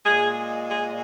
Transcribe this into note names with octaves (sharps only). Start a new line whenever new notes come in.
A#2 G#3 G#4
G#4